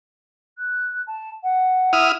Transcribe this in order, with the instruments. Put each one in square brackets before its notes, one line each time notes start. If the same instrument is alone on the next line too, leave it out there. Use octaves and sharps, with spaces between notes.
[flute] F#6
A5
F#5
[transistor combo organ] E4 D#6 F6